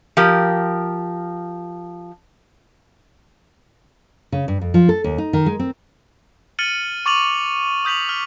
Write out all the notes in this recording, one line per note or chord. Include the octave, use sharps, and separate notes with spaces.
F3 G4 A#4
C#3
G2
F2
F3
A4
D#2
D#4
D#3
G#3
C4
F6 A6 C#7 D#7 F#7
C#6 D6 A6 D#7 F7 F#7
D#6 G6 B6 F7 F#7
F6